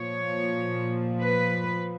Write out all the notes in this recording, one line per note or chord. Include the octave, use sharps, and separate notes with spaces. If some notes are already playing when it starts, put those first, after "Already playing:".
Already playing: A#2 F3 C#5
B4